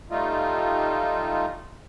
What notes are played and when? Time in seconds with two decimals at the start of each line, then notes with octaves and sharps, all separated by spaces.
0.10 G3 A3 D#4 F4